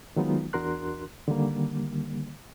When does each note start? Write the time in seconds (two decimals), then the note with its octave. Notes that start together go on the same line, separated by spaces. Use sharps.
0.16 D#3 F#3 G#3 B3 D#4 F4
0.53 E2 D4 F#4 A#4 C6 F#6
1.28 D3 D#3 G3 A#3